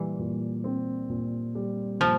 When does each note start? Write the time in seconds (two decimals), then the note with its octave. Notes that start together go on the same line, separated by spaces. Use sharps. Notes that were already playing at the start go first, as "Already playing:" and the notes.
Already playing: A#2 E3 G3
0.19 A#2
0.64 C4
1.09 A#2
1.55 G3
2.00 A#2 F3